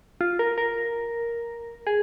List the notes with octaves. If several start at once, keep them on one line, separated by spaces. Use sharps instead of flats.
F4
A#4
A#4
G#4